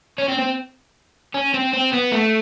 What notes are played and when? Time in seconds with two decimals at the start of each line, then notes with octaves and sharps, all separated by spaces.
0.18 C#4
0.28 C4
0.38 C4
1.34 C#4
1.54 C4
1.73 C4
1.92 B3
2.12 A3